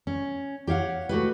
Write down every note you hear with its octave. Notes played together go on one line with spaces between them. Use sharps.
C#4
G4 C#5 F5 F#5
A3 F#4 G4 B4